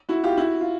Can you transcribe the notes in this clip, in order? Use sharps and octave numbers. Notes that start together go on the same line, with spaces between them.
E4 F#4
F4 G4
E4 F#4
F4